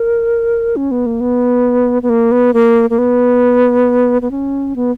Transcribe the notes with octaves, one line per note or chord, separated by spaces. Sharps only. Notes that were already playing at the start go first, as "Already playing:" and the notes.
Already playing: A#4
C#4
B3
A#3
B3
B3
A#3
B3
A#3
A#3
B3
B3
C#4
B3